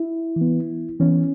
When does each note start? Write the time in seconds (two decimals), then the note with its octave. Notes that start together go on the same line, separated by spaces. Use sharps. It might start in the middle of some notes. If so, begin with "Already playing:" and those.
Already playing: E4
0.36 E3
0.41 B3
1.00 E3 B3 C#4